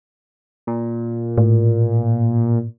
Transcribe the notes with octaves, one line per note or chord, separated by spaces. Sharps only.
A#2
A2